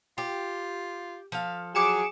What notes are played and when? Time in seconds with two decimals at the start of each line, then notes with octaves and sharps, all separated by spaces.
0.18 F4 G4
1.32 F3 A4 F5
1.75 F#3 G#4 D6 C#7 E7